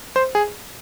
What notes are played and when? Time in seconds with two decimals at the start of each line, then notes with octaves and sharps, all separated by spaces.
0.16 C5
0.35 G#4